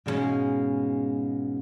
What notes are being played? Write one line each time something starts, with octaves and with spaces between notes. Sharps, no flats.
G#2 B2 D3 G#3 C#4 F5